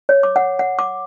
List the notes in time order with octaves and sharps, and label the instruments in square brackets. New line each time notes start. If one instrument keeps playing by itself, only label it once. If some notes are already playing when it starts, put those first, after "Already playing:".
[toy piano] C#5
D6
F#5
F#5
D6